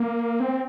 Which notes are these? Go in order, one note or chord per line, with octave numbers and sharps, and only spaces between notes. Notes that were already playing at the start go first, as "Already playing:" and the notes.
Already playing: A#3
C4